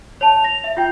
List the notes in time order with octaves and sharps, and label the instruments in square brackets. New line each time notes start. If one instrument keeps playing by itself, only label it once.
[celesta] C#5 A5 [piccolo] F7
[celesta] A#6
E5
[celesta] F4 G5 [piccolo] G6